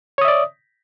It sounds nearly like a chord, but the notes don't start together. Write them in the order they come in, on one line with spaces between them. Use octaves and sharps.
C#5 D#6 E5 D5